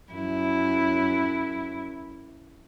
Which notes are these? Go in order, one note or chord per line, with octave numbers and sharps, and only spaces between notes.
F#2 E4